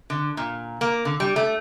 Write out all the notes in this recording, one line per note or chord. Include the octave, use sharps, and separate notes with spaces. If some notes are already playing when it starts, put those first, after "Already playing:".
D3
A#2
A#3
D3
G3
A3